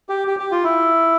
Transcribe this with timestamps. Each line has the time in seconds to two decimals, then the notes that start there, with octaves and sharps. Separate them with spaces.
0.09 G4
0.28 G4
0.39 G4
0.52 F4
0.64 E4